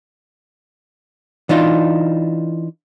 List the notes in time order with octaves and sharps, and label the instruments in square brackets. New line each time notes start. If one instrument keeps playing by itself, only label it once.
[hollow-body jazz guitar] E3 D4 D#4 F4